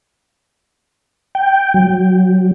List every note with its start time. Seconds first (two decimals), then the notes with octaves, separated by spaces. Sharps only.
1.35 G5
1.74 F#3